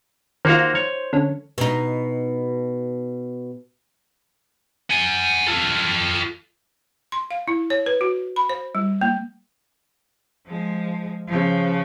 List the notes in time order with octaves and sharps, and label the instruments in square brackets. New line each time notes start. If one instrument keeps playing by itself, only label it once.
[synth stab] D#3 F4 [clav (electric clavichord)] A#3 F#4 A#5 [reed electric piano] C5
[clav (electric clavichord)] C#5
[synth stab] D3 C#4
[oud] B2 D#4
[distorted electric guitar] F#5 G#5
F4 A4
[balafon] C6
F5
E4
C#5
B4
F#4
B5
C5
G3
A#3
[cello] F3 G#3
C#3 F3